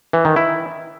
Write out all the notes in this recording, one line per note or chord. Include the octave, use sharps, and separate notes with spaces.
E3
D#3
E4